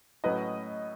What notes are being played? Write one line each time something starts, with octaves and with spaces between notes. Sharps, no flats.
A2 F#3 C#4 B4 D#5